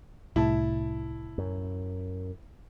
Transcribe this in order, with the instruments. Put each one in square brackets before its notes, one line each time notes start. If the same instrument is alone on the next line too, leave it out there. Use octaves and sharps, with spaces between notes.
[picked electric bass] C2 A2 [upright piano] E4 A5
[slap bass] F#2